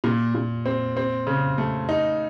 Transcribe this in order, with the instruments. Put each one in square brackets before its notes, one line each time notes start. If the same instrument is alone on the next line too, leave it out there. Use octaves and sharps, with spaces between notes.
[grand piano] A#2
A#2
C4
C4
C#3
A3
D#4